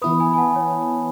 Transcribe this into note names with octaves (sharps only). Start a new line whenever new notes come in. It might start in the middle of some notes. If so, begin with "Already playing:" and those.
E3 B3 E4 B4 B5 D#6
G#5 B5
G#5
F#5 A5
C#5